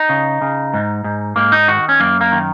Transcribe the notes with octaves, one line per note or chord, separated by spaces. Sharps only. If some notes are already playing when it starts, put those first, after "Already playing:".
Already playing: D#4
C#3
C#3
G#2
G#2
G#2 A#3
D#4
D#3 F#4
C#4
F#2 A#3
A#3
D#3